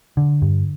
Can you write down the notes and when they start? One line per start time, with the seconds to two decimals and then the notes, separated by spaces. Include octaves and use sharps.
0.17 D3
0.42 G2